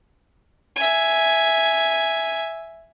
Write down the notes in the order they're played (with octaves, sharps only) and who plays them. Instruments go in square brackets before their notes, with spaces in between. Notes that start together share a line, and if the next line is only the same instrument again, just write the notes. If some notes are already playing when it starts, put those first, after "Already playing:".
[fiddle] E5 G#5